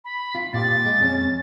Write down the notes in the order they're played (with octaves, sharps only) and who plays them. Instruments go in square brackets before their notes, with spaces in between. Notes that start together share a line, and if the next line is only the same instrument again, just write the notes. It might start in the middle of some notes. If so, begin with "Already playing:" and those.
[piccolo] B5
[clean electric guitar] F4
[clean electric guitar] A#2 F4 G4 [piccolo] A6
[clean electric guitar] G#3
F2 C#4